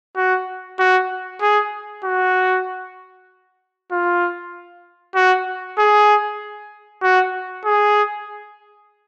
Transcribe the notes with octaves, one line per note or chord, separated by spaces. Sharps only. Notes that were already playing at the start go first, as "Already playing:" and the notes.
F#4
F#4
G#4
F#4
F4
F#4
G#4
F#4
G#4